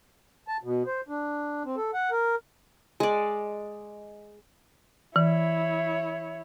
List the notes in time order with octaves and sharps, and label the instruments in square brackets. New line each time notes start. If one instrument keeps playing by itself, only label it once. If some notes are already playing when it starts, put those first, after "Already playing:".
[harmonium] A5
B2
C5
D4
C4
A4
F#5
A#4
[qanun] G#3 D5
[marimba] E3 [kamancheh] E4 C#5